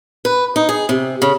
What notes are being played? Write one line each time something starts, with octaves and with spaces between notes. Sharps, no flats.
B4
D#4
G#4
C3
C#3